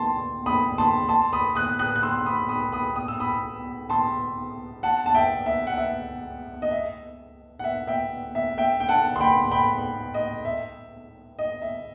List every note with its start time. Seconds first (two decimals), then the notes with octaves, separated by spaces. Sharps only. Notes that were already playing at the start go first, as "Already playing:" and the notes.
Already playing: A5 C6
0.46 B5 D#6
0.78 A5 C6
1.09 A5 C6
1.33 B5 D#6
1.55 D#6 F#6
1.79 D#6 F#6
1.96 F#6
2.03 C6 E6
2.26 B5 D#6
2.49 B5 D#6
2.72 B5 D#6
2.96 D#6
3.08 E6
3.20 B5 D#6
3.90 A5 C6
4.83 F#5 A5
5.06 A5
5.14 E5 G5
5.46 E5
5.67 F#5
5.78 E5
6.62 D#5
6.71 E5
7.59 F#5
7.64 E5
7.87 E5 G5
8.35 E5
8.58 E5 G5
8.80 G5
8.89 F#5 A5
9.16 C6
9.20 G5 B5
9.51 G5 B5
10.14 D#5
10.45 E5
11.39 D#5
11.62 E5